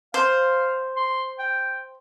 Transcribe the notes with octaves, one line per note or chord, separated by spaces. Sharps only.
C5 F5
C6
G5